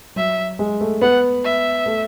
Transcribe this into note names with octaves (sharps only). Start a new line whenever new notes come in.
F#3 E5
G#3
A3
B3 F#5
E5
A3